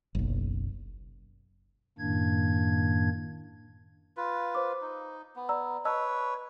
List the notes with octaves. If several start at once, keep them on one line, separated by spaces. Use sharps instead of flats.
F#1 B1
F#2 A2 D#3 A#3 D4 G#6
F4 B4
C5 D6
D#4
B3
D5 A#5 E6
B4 C#5 D#5 A5 E6